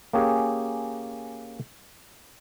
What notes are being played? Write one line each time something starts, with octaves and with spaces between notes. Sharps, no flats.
A#3 C#4 G4 G#4